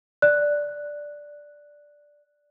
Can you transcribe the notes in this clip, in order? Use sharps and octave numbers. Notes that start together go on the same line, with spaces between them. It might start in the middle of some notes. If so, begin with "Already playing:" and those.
D5 F#6